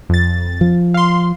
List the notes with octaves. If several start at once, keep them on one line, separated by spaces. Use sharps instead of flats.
F2 A6
F3
F5 C6